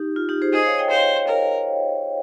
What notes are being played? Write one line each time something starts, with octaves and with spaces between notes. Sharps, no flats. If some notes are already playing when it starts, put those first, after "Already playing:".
Already playing: D#4 G4
F4
D#4 G4
G#4 C5
G#4 C5 D#5
C#5 F5
D#5 G5
C5 C#5 F5
A#4